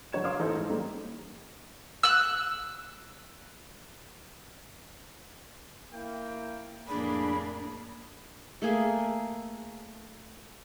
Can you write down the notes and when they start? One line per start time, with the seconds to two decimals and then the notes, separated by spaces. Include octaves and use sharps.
0.12 F#1 F#3 D4 C#5 G#6 E7
0.24 C#5 F5 C6 D6 D#6 F6
0.40 A1 D#4 E4 A4 C5
0.55 G#2
0.69 D#3 G3 A3 A#3
2.03 E6 F#6
5.92 A#3 E4 G5
6.88 F2 A2 A#3 D4 G#4 B5
8.62 A3 A#3 G#4 E5